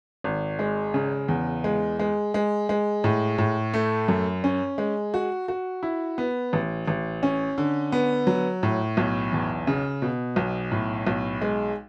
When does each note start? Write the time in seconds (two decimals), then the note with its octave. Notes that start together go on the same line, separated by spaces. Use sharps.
0.24 G#1
0.59 G#3
0.94 C#3
1.29 E2
1.64 G#3
1.99 G#3
2.34 G#3
2.69 G#3
3.04 A2
3.38 A2
3.74 A3
4.08 F#2
4.44 C#4
4.78 G#3
5.14 F#4
5.48 F#4
5.83 E4
6.18 B3
6.53 A1
6.88 A1
7.23 C#4
7.58 D3
7.92 B3
8.27 F#3
8.63 A2
8.97 B1
9.33 E2
9.67 C#3
10.02 B2
10.36 B1
10.72 A2
11.07 B1
11.42 G#3